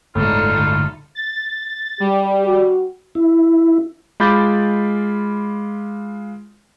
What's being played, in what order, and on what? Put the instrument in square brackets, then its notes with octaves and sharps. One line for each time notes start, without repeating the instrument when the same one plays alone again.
[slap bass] G1 G#3 [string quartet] D2 D#4 A4 [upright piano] A2 [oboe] F4
[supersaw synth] A6
[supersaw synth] G3 [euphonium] G4
[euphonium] F#4
[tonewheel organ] E4
[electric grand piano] G#3 F4 B5 D6 G6 A6